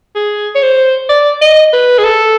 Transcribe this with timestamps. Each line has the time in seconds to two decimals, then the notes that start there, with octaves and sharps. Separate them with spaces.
0.15 G#4
0.55 C#5
0.62 C5
1.09 D5
1.41 D#5
1.73 B4
1.98 G#4
2.04 A4